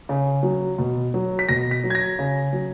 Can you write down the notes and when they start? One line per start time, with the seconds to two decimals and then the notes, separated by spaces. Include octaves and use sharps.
0.09 C#3
0.43 F#3
0.78 B2
1.14 F#3
1.39 B6
1.49 B2 A#6
1.71 B6
1.84 F#3
1.90 G#6
1.95 A#6
2.19 C#3
2.53 F#3